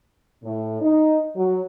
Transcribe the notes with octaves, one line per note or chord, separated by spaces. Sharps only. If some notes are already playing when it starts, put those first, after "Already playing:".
A2
D#4
F#3